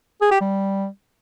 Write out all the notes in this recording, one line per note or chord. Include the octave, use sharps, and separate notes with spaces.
G#4
G4
G3